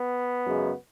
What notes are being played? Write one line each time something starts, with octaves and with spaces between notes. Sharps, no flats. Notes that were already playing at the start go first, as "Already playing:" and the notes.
Already playing: B3
F#2 C#3 G#3